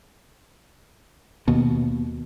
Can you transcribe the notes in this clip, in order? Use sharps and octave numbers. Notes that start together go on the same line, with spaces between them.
D#2 B2